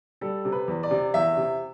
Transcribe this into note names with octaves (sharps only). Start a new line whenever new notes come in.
G3 A4
C3
B4
E2
D5
C3
E2 E5
C3